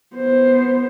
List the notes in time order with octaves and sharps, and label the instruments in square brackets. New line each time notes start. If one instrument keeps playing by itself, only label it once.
[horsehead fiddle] B3 C5